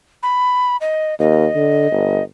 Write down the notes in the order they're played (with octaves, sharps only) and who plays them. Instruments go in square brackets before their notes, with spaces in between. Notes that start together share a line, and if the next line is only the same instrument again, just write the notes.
[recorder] B5
D#5
[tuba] D#2 [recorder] D#5
[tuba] D3
G1